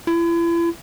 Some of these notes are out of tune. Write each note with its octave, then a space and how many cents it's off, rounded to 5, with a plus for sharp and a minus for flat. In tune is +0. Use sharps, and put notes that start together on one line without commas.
E4 +40